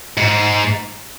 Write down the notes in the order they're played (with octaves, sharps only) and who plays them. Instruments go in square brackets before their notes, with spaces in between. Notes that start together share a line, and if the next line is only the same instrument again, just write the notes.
[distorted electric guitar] G#2